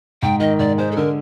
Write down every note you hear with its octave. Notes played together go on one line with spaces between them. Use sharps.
G#2 G5
D#3 D#5
G#2 D5
G#3 C5
A4
D3 A#4